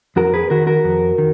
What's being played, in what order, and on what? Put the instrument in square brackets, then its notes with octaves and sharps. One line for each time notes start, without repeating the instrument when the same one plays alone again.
[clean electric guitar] F2 F#4 A#4
G#4 B4
D#3 F#4 A#4
F#4 A#4
F2
D#3